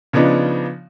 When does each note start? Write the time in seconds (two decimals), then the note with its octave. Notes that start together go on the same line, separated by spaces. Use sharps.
0.13 C#3 F3 B3 D4 D#4